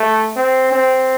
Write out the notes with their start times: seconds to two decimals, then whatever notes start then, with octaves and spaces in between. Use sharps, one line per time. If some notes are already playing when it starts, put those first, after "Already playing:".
Already playing: A3
0.37 C4
0.72 C4